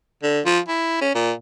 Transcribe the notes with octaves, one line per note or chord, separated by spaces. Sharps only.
D3
F3
E4
C#4
A#2